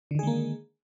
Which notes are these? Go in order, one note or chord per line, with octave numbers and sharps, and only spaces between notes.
D3 D#3 G#3 A#3 G#4